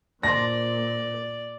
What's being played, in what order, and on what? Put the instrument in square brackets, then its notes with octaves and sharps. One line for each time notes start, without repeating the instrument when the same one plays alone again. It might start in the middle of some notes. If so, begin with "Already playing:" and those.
[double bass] A#2 [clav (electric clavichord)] D4 C5 [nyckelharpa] D5 [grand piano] A#6